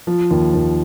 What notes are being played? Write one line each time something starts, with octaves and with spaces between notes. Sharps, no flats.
F3
D#2
D#2